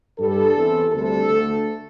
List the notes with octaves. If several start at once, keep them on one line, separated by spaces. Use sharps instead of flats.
G2 G3 A4
E2 C3 E3
D2 C3 G3 A4
D2 D3 A3